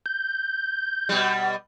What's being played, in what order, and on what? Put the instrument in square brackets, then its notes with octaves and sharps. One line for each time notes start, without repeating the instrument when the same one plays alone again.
[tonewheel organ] G6
[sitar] B2 G3